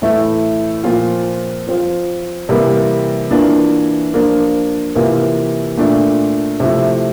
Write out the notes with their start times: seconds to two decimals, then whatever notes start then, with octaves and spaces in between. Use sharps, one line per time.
0.02 A2 E3 A3 E4
0.84 A#2 F3 C4 F4
1.67 F3 C4 F4
2.49 C3 E3 G3 A#3
3.31 E3 A#3 D4 F4
4.13 F3 A#3 D4 F4
4.95 C3 E3 A#3 F4
5.77 A#2 A3 D4
6.60 C3 F3 A3 E4